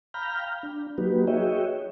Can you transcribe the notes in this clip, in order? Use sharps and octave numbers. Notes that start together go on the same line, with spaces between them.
F5 G5 A#5 B5 F6 G6
D4
F#3 A#3 D#4 F#4 G4 B4
F#4 G#4 C#5 D#5 E5 G5